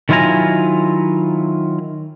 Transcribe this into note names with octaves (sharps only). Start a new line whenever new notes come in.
D#3 F#3 E4 F4 G#5 A#5